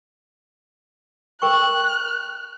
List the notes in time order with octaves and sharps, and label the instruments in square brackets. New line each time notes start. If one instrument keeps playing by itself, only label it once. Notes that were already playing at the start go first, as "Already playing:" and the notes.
[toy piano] A#4 G5 C#6 [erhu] F#6